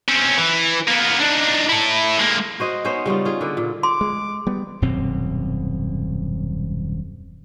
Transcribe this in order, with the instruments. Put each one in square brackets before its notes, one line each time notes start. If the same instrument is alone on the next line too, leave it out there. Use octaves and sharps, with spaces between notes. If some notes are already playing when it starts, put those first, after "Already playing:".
[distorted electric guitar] C4 C#4
E3
A#3 B3
D4 D#4
E4 A4
G#3 A#3
[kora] F#4 C5 D#5
B3 C#4 D#4 C5
C#3 G3 D#4 F4
F4 G#4
D3 B4 D5
A#2
[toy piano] C6 [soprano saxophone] D6
[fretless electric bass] G#3
G3 B3
[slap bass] D#1 F#2 B2 C4